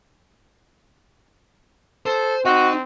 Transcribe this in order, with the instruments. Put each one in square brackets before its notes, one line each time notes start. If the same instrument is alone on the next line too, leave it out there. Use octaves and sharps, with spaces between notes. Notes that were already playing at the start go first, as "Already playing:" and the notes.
[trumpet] A4 [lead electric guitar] C5
[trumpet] C4 [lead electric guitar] D#4 D#5 [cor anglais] F#4